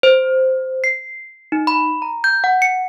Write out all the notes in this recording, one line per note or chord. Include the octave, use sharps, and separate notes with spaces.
C5
C7
D#4
B5
A#5
G6
F#5
C#7